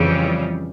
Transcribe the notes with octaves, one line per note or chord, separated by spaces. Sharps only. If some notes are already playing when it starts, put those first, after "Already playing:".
Already playing: F2 C#3 E3 G3